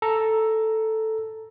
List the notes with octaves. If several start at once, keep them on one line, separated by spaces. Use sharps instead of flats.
A4 A#5